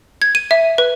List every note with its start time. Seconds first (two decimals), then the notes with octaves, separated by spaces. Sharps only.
0.22 G#6
0.35 D#7
0.51 E5
0.78 B4